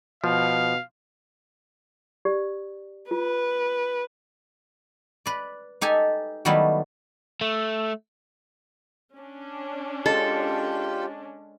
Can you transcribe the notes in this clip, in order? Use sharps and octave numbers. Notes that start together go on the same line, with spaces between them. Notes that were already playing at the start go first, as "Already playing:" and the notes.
B2 F3 F5
G4 D5
F4 B4
B4 D5
D#4 G4 A4 G#5
D#3 F#3 G3 A3 B3 E4
A3
C#4 D4
G#3 F4 G4 A4